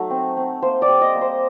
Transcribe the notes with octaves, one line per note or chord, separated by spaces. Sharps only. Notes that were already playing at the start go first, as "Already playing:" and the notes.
Already playing: F#3 A3 D#4
C4
C4
A#3 C5
D5
G3
D#5
A#3
C5